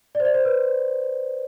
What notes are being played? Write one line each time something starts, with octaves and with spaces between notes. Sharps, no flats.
D5
C5
D5
C5
B4